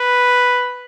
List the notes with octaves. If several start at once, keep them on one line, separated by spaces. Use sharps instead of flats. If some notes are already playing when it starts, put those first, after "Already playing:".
Already playing: B4